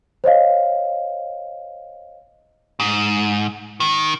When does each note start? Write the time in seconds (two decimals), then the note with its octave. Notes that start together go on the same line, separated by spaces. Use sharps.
0.24 C5 C#5 D#5 F5
2.80 G#2
3.80 D#3